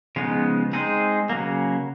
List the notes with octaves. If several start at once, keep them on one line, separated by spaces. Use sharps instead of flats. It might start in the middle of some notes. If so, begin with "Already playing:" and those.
C#3 F3 G#3 B3 D#4
G#3 C4 D#4 G#4 C5
C#3 F#3 A#3